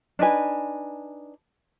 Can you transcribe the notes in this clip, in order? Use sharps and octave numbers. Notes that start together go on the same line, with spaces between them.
D4 D#4 B4 G#5